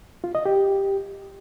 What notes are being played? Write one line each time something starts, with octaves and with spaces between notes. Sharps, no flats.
F4
D#5
G4